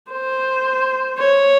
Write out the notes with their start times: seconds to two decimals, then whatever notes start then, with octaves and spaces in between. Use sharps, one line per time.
0.12 C5
1.18 C#5